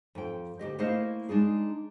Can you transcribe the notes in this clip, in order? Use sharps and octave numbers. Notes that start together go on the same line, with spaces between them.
F2 G5
D2 C#3 G4 D#5
A3 A#3 E4 C5 D#5 F5
G#3 D4 D#4 G#4